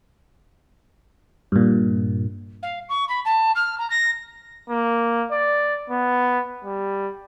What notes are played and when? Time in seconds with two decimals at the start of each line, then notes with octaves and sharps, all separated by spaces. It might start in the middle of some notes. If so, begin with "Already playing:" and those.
1.52 G2 A#2
2.62 F5
2.88 C#6
3.08 B5
3.25 A5
3.55 F6
3.78 A#5
3.90 A#6
4.69 A#3
5.31 D5
5.90 B3
6.64 G3